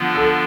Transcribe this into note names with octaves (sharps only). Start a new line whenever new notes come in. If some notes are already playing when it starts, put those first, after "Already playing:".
Already playing: D3 F3 B3 D4 F4
A4